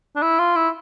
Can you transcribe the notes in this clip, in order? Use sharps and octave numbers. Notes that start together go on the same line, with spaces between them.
D4
E4
F4
E4